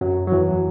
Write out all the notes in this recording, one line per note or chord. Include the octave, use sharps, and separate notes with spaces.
F#2 F#3
F#3
E2 E3